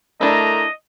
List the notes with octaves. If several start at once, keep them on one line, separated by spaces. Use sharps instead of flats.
A3 D4 E4 A#4 D#5 A#5